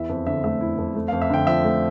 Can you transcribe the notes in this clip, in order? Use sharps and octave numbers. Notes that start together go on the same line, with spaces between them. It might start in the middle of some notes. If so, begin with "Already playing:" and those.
Already playing: E2 E4 E5
F2
D3 E5
A3 E5
E4
F2
A3
F2 F5
E5
D3 G5
F3 E5
A3